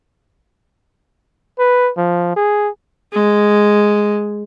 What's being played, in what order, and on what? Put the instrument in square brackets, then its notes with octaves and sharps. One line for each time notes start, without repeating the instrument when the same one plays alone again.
[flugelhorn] B4
F3
G#4
[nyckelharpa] G#3